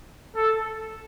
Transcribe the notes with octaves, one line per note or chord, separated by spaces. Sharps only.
A4